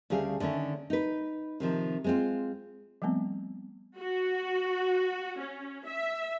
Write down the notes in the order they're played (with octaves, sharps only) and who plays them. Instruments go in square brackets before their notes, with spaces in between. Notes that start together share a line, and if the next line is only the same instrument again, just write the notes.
[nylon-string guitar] D2 C#3 G3 G#4 F5
D3 D#3 A3 C#4
D#4 B4
C3 D#3 F3
G#3 C4 F4
[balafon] F3 G3 A3 B3 C4
[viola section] F#4
C#4
E5